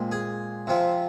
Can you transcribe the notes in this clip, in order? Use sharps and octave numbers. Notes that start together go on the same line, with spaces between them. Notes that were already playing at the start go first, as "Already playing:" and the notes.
Already playing: A#2 G#3 C4
G#4
C3 F3 C4